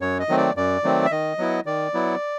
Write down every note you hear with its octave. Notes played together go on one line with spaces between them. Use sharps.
F#2 C#5
D#5
D#3 F#3 A3 C4
D5
F#2 D5
D#3 F#3 A3 C4
E5
D#3 D#5
F#3 B3 E4
D#3 D5
F#3 B3 E4